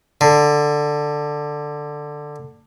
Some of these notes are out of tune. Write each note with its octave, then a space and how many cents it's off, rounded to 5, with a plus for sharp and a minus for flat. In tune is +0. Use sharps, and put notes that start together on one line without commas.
D3 +10